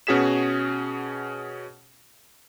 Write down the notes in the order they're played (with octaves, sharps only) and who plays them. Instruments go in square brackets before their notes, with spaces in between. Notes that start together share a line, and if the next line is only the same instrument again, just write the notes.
[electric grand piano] B2 C#4 F#4 G#4 B6 E7